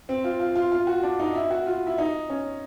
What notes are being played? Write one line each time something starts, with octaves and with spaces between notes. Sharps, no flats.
C4
F4
F4
F4
F4
F#4
D4
D#4
E4
F#4
F4
E4
D#4
C#4